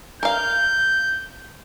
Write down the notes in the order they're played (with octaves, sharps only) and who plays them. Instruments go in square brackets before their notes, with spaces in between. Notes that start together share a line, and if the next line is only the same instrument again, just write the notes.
[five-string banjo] A#4 F5 [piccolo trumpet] G6